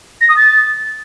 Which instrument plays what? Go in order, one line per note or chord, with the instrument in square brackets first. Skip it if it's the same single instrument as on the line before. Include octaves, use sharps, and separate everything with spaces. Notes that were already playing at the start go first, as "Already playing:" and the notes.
[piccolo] A#6
D#6
A6